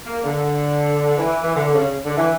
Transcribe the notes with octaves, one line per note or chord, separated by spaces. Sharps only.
A#3
D3
E3
E3
D3
C#3
D3
E3